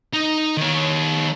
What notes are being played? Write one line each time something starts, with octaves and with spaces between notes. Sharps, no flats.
D#4
D#3 C#5